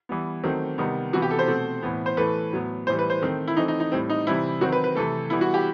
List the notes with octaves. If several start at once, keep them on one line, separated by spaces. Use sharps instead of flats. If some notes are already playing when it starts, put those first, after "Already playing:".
E3 G3 B3
D#3 F#3 A3 C4
C3 D#3 G3 B3
C3 E3 B3 F#4
G4
A4
C5
B2 A3 C4
A2 E3 B3
C5
A2 E3 A3 B4
A2 F#3 B3
A2 E3 G3 C5
B4
C5
D#3 A3 C4
E4
E3 A3 C4 D#4
D#4
D#4
A2 G3 C4
D#4
C3 E3 G3 C4 E4
D#3 F#3 C4 F#4
B4
B4
C3 E3 A3 A4
E3 G3 B3 E4
F#4
G4